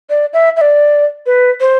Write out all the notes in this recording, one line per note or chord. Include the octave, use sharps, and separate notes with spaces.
D5
E5
E5
D5
B4
C5